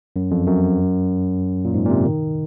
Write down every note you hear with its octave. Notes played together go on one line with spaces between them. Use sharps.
F#2
F2
F#2
A#2
G#2
A#2
C3
D#3